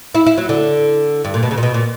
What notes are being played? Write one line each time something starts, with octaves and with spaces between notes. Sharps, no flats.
E4
E4
F#3
D3
G2
A#2
B2
C#3
A#2
B2
A#2